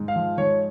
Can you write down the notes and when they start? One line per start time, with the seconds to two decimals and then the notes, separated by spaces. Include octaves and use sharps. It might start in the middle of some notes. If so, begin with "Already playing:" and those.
Already playing: G#2
0.08 F5
0.16 F3
0.38 G#2 C#5